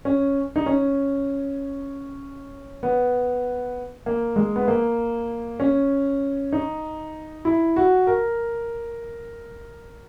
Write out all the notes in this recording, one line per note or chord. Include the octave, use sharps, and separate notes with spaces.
C#4
D#4
C#4
B3
A#3
G#3
B3
A#3
C#4
D#4
E4
F#4
A#4